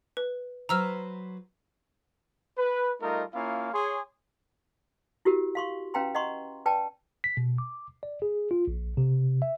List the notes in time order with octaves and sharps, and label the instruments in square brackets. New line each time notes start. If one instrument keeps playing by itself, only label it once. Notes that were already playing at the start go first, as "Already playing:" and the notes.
[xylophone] B4
[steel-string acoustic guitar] F#3 B4 C5 [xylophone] A#5 E6 F6
[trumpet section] B4
G3 A3 D#4 F4 A#4 D#5
A#3 C#4 E4 F4 F5
G#4 C#5 C6
[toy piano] E4 F#4 G4 A#4
F5 C6 C#6
C#4 B4 F5 G5 A#5 C6
D#5 F#5 A#5 C6 C#6
B4 D5 G5 A5
[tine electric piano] B6
B2
D6
D5
G#4
F4
A#1
C3
E5